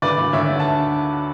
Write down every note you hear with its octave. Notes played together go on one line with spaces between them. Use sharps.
D2 B4 D5
D2
D2 C#5 E5
D3
A5